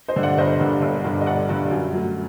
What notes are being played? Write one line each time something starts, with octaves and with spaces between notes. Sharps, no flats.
C5 D#5
G2 D3
D5 F#5
G1 C5 D#5
G2 D3
G1
G2 D3
D#5
G1 D5 F#5
G2 D3
F#2
F#3 A3